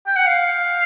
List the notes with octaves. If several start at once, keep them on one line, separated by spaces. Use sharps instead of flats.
G5
F#5
F5